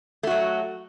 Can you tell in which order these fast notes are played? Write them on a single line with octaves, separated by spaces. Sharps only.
A3 F#4 F#3